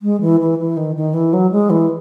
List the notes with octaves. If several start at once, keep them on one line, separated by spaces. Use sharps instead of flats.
G#3
E3
E3
E3
D#3
D#3
E3
F#3
G#3
E3